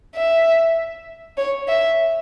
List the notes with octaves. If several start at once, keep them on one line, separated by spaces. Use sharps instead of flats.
E5
C#5
E5